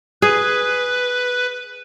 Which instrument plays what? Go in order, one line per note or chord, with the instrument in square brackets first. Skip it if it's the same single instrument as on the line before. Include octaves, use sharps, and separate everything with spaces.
[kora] G#4 [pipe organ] B4